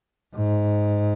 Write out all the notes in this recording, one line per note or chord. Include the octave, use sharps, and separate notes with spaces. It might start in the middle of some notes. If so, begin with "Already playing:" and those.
G#2